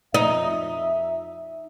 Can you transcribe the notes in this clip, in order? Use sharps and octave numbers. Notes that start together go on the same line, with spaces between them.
F2 D#4 E5